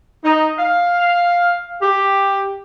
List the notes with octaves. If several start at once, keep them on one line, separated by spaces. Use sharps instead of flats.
D#4
F5
G4